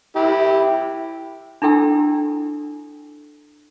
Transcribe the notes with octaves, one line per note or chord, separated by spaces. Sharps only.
E4 G4
D4 E4 A4 G5 E6